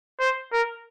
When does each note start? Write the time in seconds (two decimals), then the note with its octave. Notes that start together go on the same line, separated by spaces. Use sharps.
0.20 C5
0.53 A#4